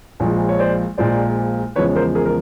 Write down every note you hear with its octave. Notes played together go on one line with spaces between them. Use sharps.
A#1 A#2 F3 G#3
C#5
C5 D5
A#1 A#2 F3 G#3 C5 D5
E2 C#3 F3 G#3 B4 C#5
C#5
A#4 C5
G#4 A#4
A#4